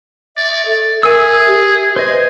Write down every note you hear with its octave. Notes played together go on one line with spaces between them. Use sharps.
D5 E5
A4
G#4 A#4 E5 G#5 E6
G4
B4 C5 D#5 G#5